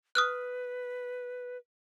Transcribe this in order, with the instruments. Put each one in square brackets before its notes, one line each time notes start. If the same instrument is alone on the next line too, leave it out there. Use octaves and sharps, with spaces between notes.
[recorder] B4 [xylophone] D#6 F6 F#6